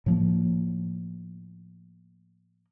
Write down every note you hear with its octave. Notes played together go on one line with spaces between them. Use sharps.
A2 F3 A#3